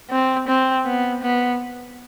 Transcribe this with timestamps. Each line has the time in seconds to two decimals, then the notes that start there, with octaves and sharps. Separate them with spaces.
0.11 C4
0.48 C4
0.86 B3
1.23 B3